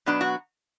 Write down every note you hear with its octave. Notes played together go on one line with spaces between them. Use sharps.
B2 F#3 B3 D4
F#4